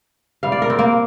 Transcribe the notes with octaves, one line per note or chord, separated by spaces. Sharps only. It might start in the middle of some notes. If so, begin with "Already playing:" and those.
C3 G3 F5
D5
A#4
C4
A#3